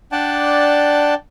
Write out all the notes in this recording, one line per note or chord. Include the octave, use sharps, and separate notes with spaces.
D4 D5 F#5 G5 A5